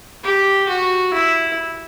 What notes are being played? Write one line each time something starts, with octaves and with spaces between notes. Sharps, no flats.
G4
F#4
E4